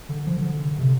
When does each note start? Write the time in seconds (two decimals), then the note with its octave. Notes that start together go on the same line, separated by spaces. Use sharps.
0.09 D3
0.26 F3
0.37 D3
0.65 D3
0.79 C3